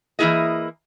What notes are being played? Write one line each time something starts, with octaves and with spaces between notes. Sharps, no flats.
E3 A#3 C#4 E4 G#4 D#5